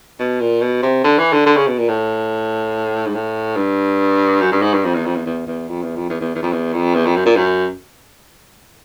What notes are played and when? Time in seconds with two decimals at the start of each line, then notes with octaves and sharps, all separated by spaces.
0.20 B2
0.41 A#2
0.62 B2
0.83 C3
1.04 D3
1.19 E3
1.33 D3
1.46 D3
1.57 C#3
1.68 B2
1.78 A#2
1.89 A2
3.07 G#2
3.15 A2
3.57 G2
4.41 F#2
4.52 G2
4.62 G#2
4.74 G2
4.84 F2
4.94 E2
5.05 F2
5.16 E2
5.26 E2
5.47 E2
5.69 F2
5.83 E2
5.96 F2
6.10 E2
6.21 E2
6.35 E2
6.43 F2
6.52 E2
6.74 F2
6.95 E2
7.06 F2
7.16 F#2
7.26 A#2
7.37 F#2